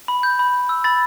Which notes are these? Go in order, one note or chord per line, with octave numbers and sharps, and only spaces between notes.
B5
G6
B5
B5
E6
B5 A6